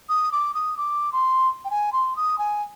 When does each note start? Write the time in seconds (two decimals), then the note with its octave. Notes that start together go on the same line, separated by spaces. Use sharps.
0.09 D#6
0.32 D6
0.54 D#6
0.77 D6
1.13 C6
1.65 G5
1.70 G#5
1.93 C6
2.16 D#6
2.38 G#5